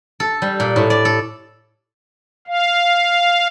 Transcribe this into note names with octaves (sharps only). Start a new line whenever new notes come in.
A4
G3
A#2
A2
D5
A4
F5